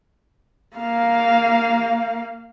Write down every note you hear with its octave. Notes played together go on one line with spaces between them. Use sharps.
A#3 F5